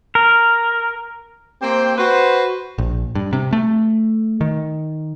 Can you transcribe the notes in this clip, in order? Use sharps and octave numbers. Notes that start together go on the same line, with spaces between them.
A#4
A#3 C4 G4 C5 G5
F#4 B4 C5
A#1
G2
C3
A3
D#3